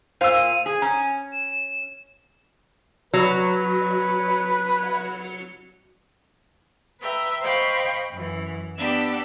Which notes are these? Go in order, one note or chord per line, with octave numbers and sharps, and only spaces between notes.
A#2 C5 F5 E6 D#7
G#4 G#5
C#4 A#5
E7
F#3 B4
B4 E5 G5 A#5
C5 D#5 F5 G5 B5 C#6
F#2 E3
B3 D4 G4 E6